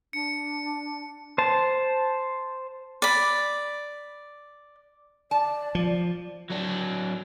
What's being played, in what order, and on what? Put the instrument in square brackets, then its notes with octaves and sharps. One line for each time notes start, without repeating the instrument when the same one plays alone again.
[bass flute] D4 [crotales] C#7
[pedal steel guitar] C5 A5
[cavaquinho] D5 B5
[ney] D5 [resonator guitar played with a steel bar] A5
[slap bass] F3
[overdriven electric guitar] F#3 D4